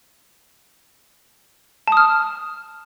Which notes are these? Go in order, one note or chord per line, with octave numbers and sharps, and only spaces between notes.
A5 D#6 F6